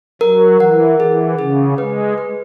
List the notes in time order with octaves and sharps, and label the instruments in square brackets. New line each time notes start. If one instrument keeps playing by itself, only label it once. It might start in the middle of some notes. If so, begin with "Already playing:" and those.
[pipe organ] F#3 [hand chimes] A#4
[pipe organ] E3 [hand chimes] F#5
[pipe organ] E3 [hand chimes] G#4
[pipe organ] C#3 [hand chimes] G#4
[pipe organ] G#3 [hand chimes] B4
[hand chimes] B4